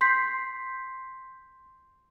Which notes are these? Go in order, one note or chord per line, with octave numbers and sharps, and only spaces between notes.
C6 G6 B6 C7